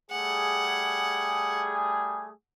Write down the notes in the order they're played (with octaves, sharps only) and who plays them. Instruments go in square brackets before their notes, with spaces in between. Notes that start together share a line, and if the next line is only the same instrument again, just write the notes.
[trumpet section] G3 A3 G#4 [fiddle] F#5